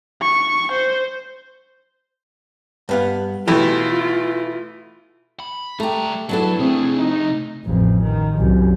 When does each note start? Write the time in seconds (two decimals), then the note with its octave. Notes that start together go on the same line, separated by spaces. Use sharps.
0.22 C#6
0.72 C5
2.89 G2 B3 F5
3.47 B2 E3 A3 F4 G4
5.40 B5
5.80 G3 A3 G4 A#5
6.29 F#3 B3 D4 E4 A4
6.59 C3 A3 C4 G#4
6.97 D#4
7.65 A1 F2
8.03 D#3
8.37 C2 F#2